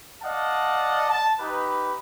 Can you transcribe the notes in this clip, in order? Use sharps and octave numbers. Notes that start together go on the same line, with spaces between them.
D5 D#5 F5 F#5 A5
A5
D#4 G4 B4